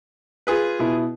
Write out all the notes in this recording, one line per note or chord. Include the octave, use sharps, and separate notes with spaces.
F4 G#4 B4
B2 E4